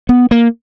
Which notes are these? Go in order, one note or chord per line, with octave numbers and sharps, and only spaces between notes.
B3
A#3